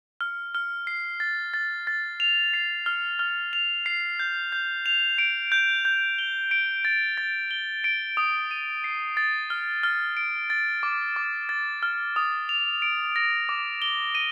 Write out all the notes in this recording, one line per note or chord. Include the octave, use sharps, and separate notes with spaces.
F6
F6
C7
A6
A6
A6
F7
C7
F6
F6
F7
C7
G6
G6
F7
D7
G6
G6
G7
D7
A6
A6
G7
D7
D#6
D#7
C7
A6
F6
F6
D7
A6
D6
D6
A6
F6
D#6
F7
D7
A#6
D6
G7
D#7